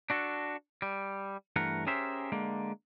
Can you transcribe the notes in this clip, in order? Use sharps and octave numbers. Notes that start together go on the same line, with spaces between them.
D4 F#4 A4
G3
G2 E3 A3 A#4 F#5
C#4 G4 G#4 A#4 C5 E5
D3 G#3 A#3